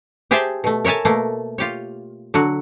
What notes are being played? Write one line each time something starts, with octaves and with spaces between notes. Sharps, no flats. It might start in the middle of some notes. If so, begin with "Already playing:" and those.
G4 G#4 C5 E5 G5 A5
B2 A3
A#4 C#5 E5 G#5 A5
B2 A3 A#3
F4 G4 C#5
D3 F#3 F#4